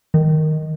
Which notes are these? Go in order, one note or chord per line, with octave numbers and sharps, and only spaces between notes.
D#3